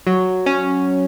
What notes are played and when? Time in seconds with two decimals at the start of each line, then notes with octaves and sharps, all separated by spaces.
0.07 F#3
0.46 C#4